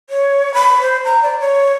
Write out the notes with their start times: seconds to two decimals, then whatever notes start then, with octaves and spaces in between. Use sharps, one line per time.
0.10 C#5
0.54 B5
0.81 C5
1.05 A#5
1.23 D5
1.40 C#5